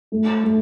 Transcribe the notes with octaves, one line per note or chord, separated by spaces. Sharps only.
A3
A3